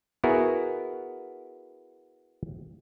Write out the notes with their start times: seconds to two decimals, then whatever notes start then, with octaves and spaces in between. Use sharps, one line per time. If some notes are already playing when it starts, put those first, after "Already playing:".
0.24 B3 E4 F#4 G#4 A#4